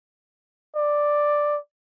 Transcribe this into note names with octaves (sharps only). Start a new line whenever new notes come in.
D5